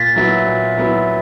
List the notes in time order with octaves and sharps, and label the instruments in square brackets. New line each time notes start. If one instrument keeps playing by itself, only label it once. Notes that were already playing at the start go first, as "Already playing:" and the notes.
Already playing: [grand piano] A#2 [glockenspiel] A6 B6
[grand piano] F#3 B3 E4
A#2
F#3 B3 E4